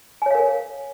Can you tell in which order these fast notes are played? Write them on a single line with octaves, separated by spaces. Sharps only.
G#5 C#5 F5 A#4